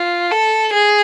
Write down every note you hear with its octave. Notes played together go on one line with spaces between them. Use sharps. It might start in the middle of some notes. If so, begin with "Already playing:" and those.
Already playing: F4
A4
G#4